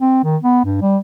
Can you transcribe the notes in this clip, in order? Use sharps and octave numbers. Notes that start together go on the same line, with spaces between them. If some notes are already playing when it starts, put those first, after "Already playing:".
C4
D#3
B3
G2
G3